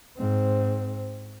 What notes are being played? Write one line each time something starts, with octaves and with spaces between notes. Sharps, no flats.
G#2 C4